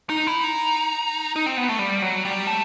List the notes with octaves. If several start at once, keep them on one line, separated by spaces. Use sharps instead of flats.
D#4
E4
D#4
D#4
C4
B3
A3
G3
F#3
G3
A3